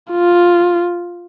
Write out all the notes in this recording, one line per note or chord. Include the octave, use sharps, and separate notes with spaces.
F4